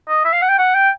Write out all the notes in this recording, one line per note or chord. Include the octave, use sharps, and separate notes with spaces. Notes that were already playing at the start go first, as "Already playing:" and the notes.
D#5
E5
F5
F#5
G5
F#5
G5